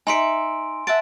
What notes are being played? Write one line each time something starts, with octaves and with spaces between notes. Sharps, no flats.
D#4 E5 G#5 C6 D7
E5 F#5 A5 D7